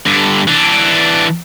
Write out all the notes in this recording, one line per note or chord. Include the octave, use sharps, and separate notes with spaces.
G2 D3
E3 D4